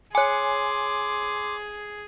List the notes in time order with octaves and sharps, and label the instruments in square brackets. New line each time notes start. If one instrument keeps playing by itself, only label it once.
[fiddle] G#4 [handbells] C#5 G#5 [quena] C6 [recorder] D6